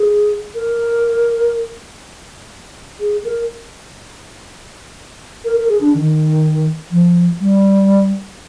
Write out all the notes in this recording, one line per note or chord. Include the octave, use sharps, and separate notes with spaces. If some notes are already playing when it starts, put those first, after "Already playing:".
Already playing: G#4
A#4
G#4
A#4
A#4
A#4
G#4
D4
D#3
F3
G3